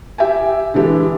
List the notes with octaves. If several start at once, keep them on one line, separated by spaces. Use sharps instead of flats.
G4 E5 G5 G#5
D3 E3 G#3 G4 A4